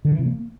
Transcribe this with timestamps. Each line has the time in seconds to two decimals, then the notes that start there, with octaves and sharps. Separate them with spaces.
0.05 D3
0.12 E3
0.19 C3
0.26 A#3